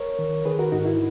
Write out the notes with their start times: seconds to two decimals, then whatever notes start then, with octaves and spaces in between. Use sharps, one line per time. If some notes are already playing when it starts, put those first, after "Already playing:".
Already playing: A#4 C#5
0.19 D#3
0.45 D#3 G#4 B4
0.59 F#4 A#4
0.72 G#2 D#4 F#4
0.86 E4